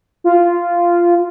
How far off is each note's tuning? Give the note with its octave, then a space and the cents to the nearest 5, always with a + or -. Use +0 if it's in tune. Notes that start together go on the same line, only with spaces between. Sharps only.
F4 -10